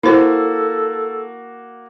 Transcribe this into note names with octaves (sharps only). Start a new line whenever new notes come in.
A#3 E4 F#4 A4 C5